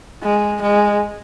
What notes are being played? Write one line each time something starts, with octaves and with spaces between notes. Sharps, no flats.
G#3
G#3